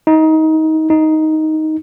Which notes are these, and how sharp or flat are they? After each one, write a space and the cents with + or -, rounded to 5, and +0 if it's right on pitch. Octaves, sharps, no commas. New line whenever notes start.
D#4 +20
D#4 +5